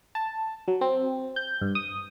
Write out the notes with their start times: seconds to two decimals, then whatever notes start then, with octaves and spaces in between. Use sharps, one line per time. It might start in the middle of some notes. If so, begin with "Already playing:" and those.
0.15 A5
0.68 F#3
0.81 C4
1.36 G6
1.61 G2
1.75 D#6